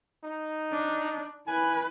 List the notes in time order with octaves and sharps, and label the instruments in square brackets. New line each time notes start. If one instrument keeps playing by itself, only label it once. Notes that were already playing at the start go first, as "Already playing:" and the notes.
[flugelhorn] D#4
[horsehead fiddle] D4
[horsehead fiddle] E4 B4 [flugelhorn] G#5